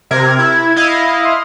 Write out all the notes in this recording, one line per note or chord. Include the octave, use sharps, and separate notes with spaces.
C3 A#4 G#6
E4
E4 D#5 F5
C6